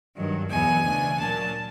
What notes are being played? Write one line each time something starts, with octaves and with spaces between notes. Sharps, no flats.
G2 D#3 F#3
E2 B2 F#3 B3 G#5
D2 C#3 E3 A3 D4
A#2 F#3 A#3 D4 A5